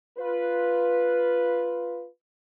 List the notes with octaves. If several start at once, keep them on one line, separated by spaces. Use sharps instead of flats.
F4 B4